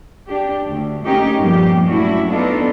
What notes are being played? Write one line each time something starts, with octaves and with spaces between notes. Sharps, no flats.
D4 G4
D2
A3 A#3 C#4 D#4 G4
G2 A#2 F3 A#3 B3 G4
F#3 A3 C#4 D4 E4 F#4
B3 D4 D#4 F4 A4